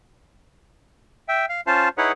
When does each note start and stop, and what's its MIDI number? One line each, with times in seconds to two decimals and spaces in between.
1.28 1.46 76
1.28 1.46 79
1.49 1.61 77
1.67 1.89 61
1.67 1.89 65
1.67 1.89 72
1.67 1.89 77
1.67 1.89 81
1.98 2.12 63
1.98 2.12 64
1.98 2.12 68
1.98 2.12 71
1.98 2.12 73
1.98 2.12 78